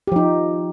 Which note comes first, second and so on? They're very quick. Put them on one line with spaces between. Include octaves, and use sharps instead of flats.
G4 F3 D#4